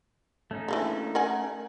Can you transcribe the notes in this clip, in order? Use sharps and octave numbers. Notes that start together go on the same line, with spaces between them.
A3 C#4 D#4
E3 A#3 D4
A#4 F#5 G#5